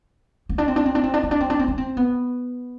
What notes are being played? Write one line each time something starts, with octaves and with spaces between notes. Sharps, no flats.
C4
D4
C4
D4
C4
D4
C4
D4
C4
D4
C4
D4
C4
D4
C4
B3